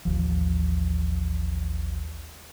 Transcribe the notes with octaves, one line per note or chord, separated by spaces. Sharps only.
A1 D#2 F3